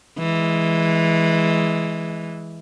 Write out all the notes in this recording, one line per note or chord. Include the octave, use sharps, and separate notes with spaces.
E3 G#3